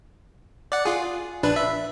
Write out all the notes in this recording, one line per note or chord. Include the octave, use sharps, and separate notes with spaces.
D5 F#5
F4 G#4
A#1 D4 B4
E5